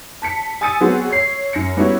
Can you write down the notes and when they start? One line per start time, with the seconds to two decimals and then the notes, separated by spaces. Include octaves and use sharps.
0.22 A5 B6 C#7
0.61 G#5 D#6 E6 A6 C#7 D#7
0.81 F#3 B3 C4 F#4 G#4
1.11 C#5 C7
1.53 F#2 A#6 C#7
1.77 G3 B3 C#4 E4 F#4